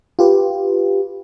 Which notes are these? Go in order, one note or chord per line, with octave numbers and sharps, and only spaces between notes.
F4 G4 B4